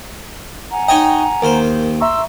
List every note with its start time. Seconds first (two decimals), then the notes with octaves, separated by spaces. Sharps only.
0.71 F#5 G#5 A#5
0.88 D#4 C#5 D#5 G5
1.42 D#2 A#4 C5
2.01 E5 A#5 C6 C#6 E6